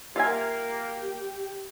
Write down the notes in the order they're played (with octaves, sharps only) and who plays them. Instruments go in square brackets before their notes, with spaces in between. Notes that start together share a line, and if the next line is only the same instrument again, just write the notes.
[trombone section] A#3 [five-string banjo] F4 E5 G#5 [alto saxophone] G4